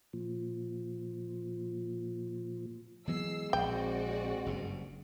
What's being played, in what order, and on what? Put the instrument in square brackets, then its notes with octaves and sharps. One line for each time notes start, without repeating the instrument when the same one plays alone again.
[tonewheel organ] A#2 F3
[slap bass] E3 F#3 B3 [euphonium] G#3 [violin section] E6 C7
[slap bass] A#1 [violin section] C4 F#4 D5 [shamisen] G5
[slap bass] F#1 G2